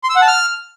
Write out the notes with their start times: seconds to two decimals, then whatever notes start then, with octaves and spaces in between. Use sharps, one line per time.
0.04 C6
0.10 E6
0.16 F#5
0.22 A5
0.28 F6